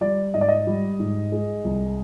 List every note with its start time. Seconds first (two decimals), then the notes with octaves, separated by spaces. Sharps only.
0.01 G3 D5
0.34 G#2 D#5
0.41 D5
0.48 D#5
0.67 G3
0.99 G#2
1.32 G#3
1.64 C2